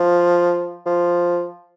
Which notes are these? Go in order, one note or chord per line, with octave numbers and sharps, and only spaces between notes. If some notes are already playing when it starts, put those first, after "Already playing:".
Already playing: F3
F3